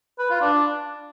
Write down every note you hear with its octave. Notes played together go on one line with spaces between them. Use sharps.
B4
F4
D4